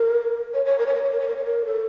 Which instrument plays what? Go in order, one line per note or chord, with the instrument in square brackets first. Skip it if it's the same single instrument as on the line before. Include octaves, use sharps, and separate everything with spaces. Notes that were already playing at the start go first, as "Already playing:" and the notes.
Already playing: [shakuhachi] A#4
C#5
C#5
A#4
C#5
A#4
C#5
A#4
C#5
A#4
C#5
A#4
A4